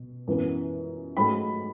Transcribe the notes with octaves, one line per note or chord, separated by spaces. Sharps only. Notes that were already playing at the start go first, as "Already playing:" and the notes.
Already playing: B2
F#2 E3 B3
G#2 F#3 A3 B5